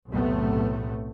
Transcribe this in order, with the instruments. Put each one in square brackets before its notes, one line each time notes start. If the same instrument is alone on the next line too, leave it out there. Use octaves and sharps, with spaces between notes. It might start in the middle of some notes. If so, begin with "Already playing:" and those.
[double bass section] B1 E2 A2 C3 A3 B3